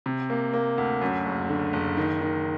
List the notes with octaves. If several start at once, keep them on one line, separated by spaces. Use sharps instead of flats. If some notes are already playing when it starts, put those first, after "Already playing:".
C3
A#3
A#3
D2
F#2
F#1
D3
F#1
D#3
D#3